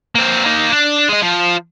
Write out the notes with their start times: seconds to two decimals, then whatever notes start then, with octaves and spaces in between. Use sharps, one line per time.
0.15 A#3 C4
0.45 A#3 D#4
0.71 D4
1.09 G#3 D#5
1.22 F3